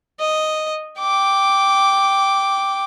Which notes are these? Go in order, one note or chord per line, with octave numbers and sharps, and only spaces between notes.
D#5
G5 D6